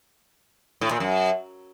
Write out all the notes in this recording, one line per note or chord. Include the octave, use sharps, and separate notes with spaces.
A2
A#2
F#2